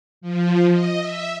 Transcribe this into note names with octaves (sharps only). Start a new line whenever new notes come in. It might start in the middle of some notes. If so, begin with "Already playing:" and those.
F3
D#5
E5